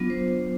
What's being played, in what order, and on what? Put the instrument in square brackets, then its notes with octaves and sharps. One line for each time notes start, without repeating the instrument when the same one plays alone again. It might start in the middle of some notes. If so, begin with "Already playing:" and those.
Already playing: [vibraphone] F#3 B3 D4 F4
C5
C5